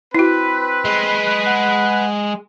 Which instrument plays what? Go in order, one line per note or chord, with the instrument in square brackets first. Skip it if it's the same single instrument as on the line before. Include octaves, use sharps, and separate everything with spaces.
[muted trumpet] C4 [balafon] E4 F#4 [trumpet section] B4
[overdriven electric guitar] G#3
[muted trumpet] F#5